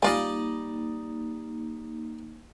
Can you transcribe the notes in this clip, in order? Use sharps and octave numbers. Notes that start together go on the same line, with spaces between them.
G3 A#3 D#4 F4 D5 D#5 F5 G#5